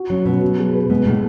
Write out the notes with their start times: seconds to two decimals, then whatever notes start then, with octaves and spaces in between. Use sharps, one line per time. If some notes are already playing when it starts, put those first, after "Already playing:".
Already playing: F#4
0.10 F#3 C#4
0.26 B2 F#3
0.41 F#3
0.58 G#4
0.74 B4
0.90 B2 G#3
1.06 A2 G#3